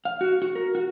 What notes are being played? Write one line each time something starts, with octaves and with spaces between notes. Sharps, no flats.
F5
F#4
F#4
A#4
F#4